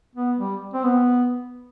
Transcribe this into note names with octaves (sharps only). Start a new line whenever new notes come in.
B3
G3
C4
B3